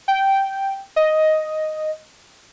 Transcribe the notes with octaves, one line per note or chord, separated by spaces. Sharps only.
G5
D#5